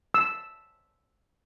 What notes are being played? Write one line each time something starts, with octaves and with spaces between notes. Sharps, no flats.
E6